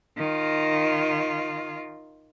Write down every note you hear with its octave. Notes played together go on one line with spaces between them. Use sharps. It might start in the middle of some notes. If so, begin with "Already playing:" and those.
D#3 F4